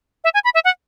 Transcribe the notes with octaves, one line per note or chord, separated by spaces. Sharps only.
E5
G#5
B5
E5
F#5